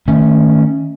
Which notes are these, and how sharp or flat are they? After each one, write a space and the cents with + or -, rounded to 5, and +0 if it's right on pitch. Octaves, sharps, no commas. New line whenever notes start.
D#3 +0 A3 +20 C#4 +0